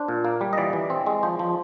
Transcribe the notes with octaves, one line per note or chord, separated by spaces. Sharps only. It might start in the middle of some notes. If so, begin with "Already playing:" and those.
Already playing: D4 C5
A#2
A#3
G3
D#5
E3 D5
E3
C4
G#3
F3 C5
F3